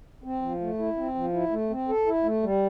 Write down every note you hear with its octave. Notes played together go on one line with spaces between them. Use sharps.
C4
F3
A3
E4
C4
F3
E4
A3
C4
A4
E4
A3
G3